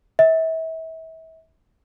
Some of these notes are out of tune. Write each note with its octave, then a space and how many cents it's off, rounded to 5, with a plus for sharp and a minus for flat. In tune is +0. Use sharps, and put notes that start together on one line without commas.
E5 -35